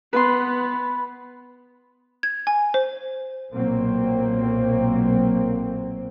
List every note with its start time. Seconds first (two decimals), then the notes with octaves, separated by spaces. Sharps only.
0.13 B3 B4 C6
2.23 G#6
2.47 G#5
2.74 C5
3.51 B1 A#2 F#3 A#3 C4